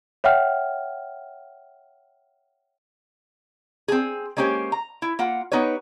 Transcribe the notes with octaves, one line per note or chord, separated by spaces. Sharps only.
C#5 E5 F#5 G5 F6
C4 G#4
G#3 A#3 C#4 G4 C5
A#5
E4
A#3 F4 F#5
B3 D#4 G4 B4 C#5